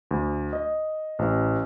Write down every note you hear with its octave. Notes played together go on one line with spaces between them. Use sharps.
D2
D#5
A1